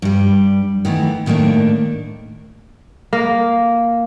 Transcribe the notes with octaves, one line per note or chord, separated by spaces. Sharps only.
G2 G3
D#3 E3 A3 B3
A2 D#3 A3 A#3 D4
A#3